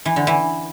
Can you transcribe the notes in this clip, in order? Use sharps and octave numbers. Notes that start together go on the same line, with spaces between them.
E3
D3
E3